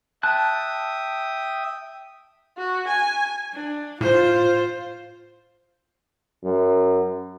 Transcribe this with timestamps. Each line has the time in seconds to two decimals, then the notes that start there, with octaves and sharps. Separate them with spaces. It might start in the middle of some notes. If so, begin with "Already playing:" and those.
0.23 E5 G5 A5 D#6 F#6
2.57 F#4
2.88 G#5
3.53 D4
4.01 A2 F4 C5
6.44 F#2